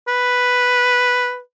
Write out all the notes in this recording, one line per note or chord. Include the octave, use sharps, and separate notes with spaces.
B4